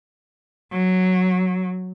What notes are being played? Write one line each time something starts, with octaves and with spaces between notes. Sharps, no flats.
F#3